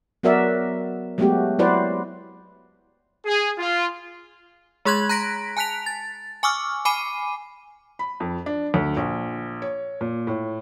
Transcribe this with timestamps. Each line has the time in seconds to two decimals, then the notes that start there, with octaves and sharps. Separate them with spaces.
0.23 F#3 B3 F#4 A#4 D5 E5
1.18 F#3 G#3 A3 B3 F#4 G4
1.59 F#3 E4 F#4 B4 C5 D5
3.25 G#4
3.58 F4
4.85 G#3 G#4 C6 F#6 G#6 F#7
5.09 A#5 F#6 A#6 B6 D7
5.57 G#5 A5 F#6 B6 F7
5.86 A6
6.43 G#5 C#6 D6 E6 F6
6.85 G#5 B5 D6 C7 D#7
7.99 B5
8.20 F2
8.46 D4
8.74 D2
8.97 A#1
9.62 C#5
10.01 A#2
10.27 A2